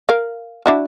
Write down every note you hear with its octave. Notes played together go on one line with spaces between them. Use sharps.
A#4 F5
D4 E4 F#4